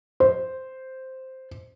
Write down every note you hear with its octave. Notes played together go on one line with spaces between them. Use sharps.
C5